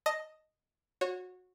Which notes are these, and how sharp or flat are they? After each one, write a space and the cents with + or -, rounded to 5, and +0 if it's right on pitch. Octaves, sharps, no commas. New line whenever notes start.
D#5 +0 A5 +5
F#4 -20 C#5 -25